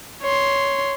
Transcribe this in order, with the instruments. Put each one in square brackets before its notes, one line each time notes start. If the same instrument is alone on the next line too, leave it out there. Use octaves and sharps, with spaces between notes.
[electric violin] C#5 C6